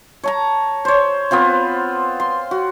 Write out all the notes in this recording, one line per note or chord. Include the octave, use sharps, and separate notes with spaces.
C#5 A5 A#5
C5 C#5
B3 C4 F4 C5
C6
F#4